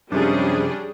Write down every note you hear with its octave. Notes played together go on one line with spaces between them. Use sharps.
F#2 C3 F3 G3 C#4 D4 G#4